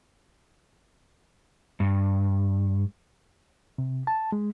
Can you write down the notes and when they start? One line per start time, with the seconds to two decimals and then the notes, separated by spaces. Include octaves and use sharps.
1.80 G2
3.78 C3
4.07 A5
4.32 G#3